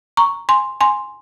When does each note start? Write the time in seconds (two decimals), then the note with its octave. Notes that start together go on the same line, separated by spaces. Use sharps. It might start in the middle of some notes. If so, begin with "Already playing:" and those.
0.17 A#5 C#6
0.49 G#5 C6
0.81 G#5 C6